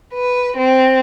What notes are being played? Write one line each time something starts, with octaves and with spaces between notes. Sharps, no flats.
B4
C4